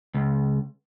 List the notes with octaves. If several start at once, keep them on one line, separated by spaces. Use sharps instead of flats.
C#2